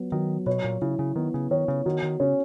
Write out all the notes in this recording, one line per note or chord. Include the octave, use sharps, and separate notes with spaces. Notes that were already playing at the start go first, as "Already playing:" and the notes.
Already playing: F#3 B3
D#3 F#3
B2 C#5
A#2
C#3 E4
C#3
D#3 B3
C#3
D#3 C#5
C#3
D#3 F#4
D#3
C#3 C#4